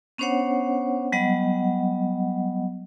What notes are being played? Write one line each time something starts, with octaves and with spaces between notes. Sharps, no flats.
B3 C#4 D4 C5 C#5 F#5
F#3 G3 B3 D#5 F#5